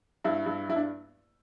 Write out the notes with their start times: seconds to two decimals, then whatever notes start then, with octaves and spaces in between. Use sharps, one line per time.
0.24 G2 E4
0.46 G2
0.69 G2 E4
0.76 D4